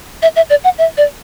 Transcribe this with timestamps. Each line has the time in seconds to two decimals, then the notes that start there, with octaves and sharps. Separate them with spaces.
0.22 E5
0.36 E5
0.50 D5
0.64 F#5
0.78 E5
0.97 D5